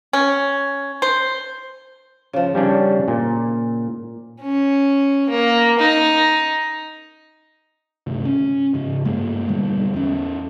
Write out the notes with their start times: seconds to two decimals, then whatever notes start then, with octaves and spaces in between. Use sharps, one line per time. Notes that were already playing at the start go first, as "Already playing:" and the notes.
0.13 C#4
1.02 C5
2.33 C#3 F3
2.55 G3 C#4 D4
3.08 A#2
4.41 C#4
5.29 A#3
5.79 D#4
8.07 D2 G2 C3
8.25 C#4
8.74 G#2 C#3
9.05 G2 G#3 A#3
9.48 E1 D3 G3
9.94 E2 C#4